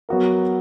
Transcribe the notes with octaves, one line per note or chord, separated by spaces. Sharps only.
F#3 B3 F#4 A#4